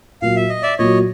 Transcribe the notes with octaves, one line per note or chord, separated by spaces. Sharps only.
A#2 F#3 A#3 F5
E5
D#5
D5 E5
A#2 F#3 A#3 C#5 D#5